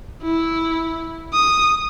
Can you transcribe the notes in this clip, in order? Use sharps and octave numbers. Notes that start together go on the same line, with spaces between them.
E4
D#6